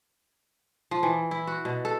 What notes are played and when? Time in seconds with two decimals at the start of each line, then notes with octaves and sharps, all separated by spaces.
0.91 F3
1.03 E3
1.31 E4
1.47 F#4
1.65 B2
1.85 A4